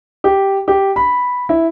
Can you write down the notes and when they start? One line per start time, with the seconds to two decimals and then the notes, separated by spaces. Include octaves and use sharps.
0.24 G4
0.68 G4
0.96 B5
1.49 E4